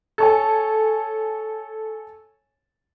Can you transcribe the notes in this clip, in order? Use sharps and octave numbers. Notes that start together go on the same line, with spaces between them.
A4 C#5 G#5